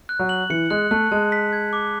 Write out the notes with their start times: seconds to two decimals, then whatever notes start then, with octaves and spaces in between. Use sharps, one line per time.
0.09 F#6
0.20 F#3
0.29 F#7
0.50 E3 C#7
0.70 G#3 F#6
0.91 A3 F#6
1.12 G#3 A5
1.32 B6
1.53 G#6
1.73 D6